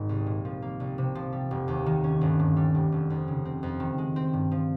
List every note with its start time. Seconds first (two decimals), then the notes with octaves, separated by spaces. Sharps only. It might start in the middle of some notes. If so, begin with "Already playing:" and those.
Already playing: G#1 G#2 D#3
0.09 C2
0.27 A#2
0.45 F3
0.62 A#3
0.80 C2
0.98 C3
1.15 F3
1.32 G3
1.51 F1
1.68 D#2
1.86 D#3
2.04 C#4
2.21 G1
2.39 G2
2.57 G3
2.75 F1
2.92 F1
3.10 F2
3.28 C#3
3.45 C4
3.63 F2
3.80 D#3
3.98 G#3
4.16 C4
4.33 G2
4.51 F3